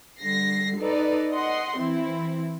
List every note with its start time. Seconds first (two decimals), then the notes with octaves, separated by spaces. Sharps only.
0.20 D3 G3 A#6 C7
0.78 D#4 A4 B4 D5
1.31 D#5 F#5 C6
1.77 E3 C4 E4